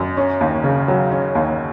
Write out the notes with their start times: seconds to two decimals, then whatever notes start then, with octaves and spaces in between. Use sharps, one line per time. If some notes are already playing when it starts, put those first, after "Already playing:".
Already playing: F#2
0.17 C#4
0.41 D#2
0.64 C#3
0.88 F#3
1.12 C#4
1.35 D#2